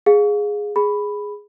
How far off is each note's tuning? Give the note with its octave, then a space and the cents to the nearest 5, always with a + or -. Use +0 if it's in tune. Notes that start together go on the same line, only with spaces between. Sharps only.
G#4 +0 F5 +25
G#4 +0 B5 +0